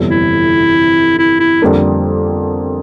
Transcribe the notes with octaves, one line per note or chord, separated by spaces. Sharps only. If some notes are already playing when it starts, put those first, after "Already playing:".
Already playing: G1 F2 C3 E3 G3
E4
E4
E4
F2 D3 G3 A#3 D4